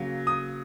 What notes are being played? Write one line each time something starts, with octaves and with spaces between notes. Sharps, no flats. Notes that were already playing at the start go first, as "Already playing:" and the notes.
Already playing: C#3 F#3 A#3
D#6